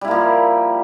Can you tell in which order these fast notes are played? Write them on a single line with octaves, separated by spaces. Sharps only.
G3 E4 A#3 F3